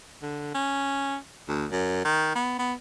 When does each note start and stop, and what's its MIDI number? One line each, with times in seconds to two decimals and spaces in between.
0.22 0.51 50
0.54 1.16 61
1.48 1.66 38
1.71 2.01 42
2.04 2.32 51
2.35 2.58 59
2.59 2.73 59